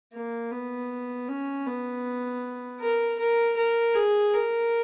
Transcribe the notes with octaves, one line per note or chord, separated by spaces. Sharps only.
A#3
B3
C#4
B3
A#4
A#4
A#4
G#4
A#4